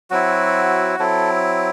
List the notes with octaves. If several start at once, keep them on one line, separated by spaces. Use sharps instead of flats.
F#3 C4 E4 F#4
F#3 C4 E4 A4